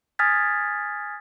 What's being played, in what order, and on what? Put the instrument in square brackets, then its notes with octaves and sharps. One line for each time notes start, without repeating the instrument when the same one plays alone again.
[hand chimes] G#5 D#6 F6 G#6 A6 B6